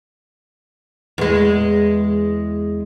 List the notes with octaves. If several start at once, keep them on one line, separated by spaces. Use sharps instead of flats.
E2 G#3